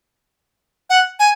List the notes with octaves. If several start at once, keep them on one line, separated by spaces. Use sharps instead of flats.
F#5
G#5